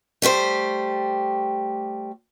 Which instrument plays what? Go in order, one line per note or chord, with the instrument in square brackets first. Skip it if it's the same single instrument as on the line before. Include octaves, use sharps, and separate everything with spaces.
[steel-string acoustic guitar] G3 A3 G4 C5